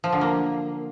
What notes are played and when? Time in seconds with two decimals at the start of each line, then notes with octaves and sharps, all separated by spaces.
0.04 F3
0.13 D3
0.21 A#3